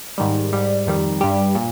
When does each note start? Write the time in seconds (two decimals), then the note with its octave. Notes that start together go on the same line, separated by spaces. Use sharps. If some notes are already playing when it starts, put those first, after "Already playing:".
0.18 G#2 D#3 G3
0.53 G#2 G3
0.86 F2 D#3 G3
1.21 G2 G3 G4
1.55 A#2